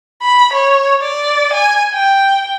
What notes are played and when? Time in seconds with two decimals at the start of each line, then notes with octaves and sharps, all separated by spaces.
0.22 B5
0.54 C#5
1.02 D5
1.53 G#5
1.94 G5